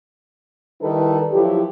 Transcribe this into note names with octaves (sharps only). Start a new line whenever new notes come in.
D#3 G3 D#4 E4 A4 B4
F3 F#3 E4 G4